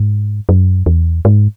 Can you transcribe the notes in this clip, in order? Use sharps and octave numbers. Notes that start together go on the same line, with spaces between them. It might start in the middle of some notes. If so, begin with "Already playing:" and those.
Already playing: G#2
F#2
E2
G#2